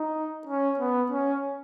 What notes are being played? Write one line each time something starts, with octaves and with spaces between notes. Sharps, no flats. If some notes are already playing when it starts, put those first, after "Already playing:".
Already playing: D#4
C#4
B3
C#4